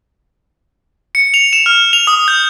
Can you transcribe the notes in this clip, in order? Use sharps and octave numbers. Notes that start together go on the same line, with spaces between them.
C#7
F7
E7
F6
F7
D#6
G6